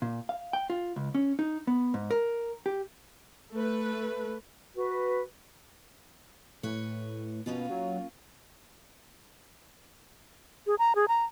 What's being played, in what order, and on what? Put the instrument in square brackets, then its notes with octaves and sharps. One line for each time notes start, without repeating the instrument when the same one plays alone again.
[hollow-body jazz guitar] A#2
F5
G5
F4
C#2
C#4
D#4
B3
G#2
A#4
G4
[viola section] A3 B4
[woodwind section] F#4 B4
[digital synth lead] A2 [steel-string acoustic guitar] B4 C#5
[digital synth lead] B2 [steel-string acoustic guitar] A#3 C#4 F4
[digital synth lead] F#3
[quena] G#4
A#5
G#4
A#5